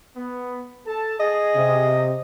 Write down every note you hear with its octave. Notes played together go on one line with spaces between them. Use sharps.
B3
A4 A5
G#4 D#5
C3